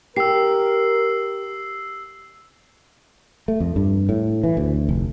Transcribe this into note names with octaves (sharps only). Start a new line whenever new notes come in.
G4 A#4 E6 C7
A3
F2
G2
A2
E3
D2
F1